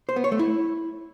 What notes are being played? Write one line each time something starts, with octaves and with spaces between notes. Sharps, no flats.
C5
B3
C#5
A3
E4